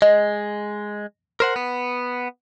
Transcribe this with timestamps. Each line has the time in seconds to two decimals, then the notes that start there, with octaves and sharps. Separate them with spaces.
0.02 G#3 D#5
1.40 A#4 C5 F#5
1.56 B3